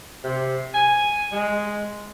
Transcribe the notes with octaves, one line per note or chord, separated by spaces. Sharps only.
C3
G#5
G#3